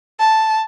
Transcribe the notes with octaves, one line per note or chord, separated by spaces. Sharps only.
A5